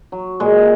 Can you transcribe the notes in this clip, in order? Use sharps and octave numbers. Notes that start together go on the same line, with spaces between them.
F#3
A#2 G#3